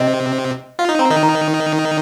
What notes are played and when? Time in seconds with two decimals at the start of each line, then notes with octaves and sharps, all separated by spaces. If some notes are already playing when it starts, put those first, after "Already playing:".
Already playing: C3 C4 D#5
0.79 F4 F5
0.89 D#4
0.99 C4 A#5
1.10 D#3 D#4
1.23 A#5